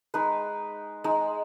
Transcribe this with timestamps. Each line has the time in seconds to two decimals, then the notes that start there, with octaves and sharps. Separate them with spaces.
0.14 G#3 D#4 B4
1.04 G#3 D#4